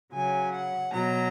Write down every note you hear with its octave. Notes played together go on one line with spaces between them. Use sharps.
C#3 F#3 G#5
F#5
B2 F#3 A#5